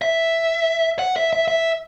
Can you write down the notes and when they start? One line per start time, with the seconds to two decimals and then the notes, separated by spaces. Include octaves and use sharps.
0.02 E5
0.99 F#5
1.16 E5
1.33 E5
1.48 E5